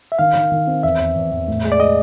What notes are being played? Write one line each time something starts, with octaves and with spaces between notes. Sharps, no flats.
E5
D#3 F5
D#3
D#3
C4
E2 E5
E2
E2
E2
A2
G#3
D5
G#3 D#5